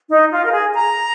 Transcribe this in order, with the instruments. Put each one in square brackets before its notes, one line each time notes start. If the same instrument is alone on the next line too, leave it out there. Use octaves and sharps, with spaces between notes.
[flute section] D#4
F4
A#4
G#4
A#5